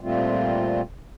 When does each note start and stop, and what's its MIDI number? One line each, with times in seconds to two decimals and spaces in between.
0.01 0.81 46
0.01 0.81 55
0.01 0.81 57
0.01 0.81 60
0.01 0.81 65